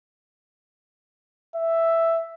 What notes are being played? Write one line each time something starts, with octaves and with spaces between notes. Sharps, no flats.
E5